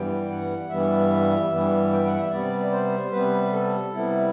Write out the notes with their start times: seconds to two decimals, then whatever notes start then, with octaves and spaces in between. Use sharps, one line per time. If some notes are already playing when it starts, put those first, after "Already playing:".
Already playing: G2 E3 G3 B3 G5
0.30 F#5
0.70 G2 E3 G3 B3 E5
1.50 G2 E3 G3 B3
1.93 G5
2.06 F#5
2.19 E5
2.31 C3 G3 B3 D5
2.60 D5
2.72 C5
3.11 C3 G3 B3 B4
3.52 A4
3.92 C3 G3 B3 E4